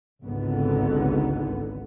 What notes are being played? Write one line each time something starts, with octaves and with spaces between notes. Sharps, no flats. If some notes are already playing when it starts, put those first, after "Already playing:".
G#1 C#2 G#2 D3 B3